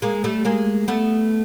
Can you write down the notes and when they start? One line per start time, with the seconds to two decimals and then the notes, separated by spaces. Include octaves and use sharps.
0.02 G#3 A#3
0.24 G3 A3
0.45 G#3 A#3
0.88 A3 B3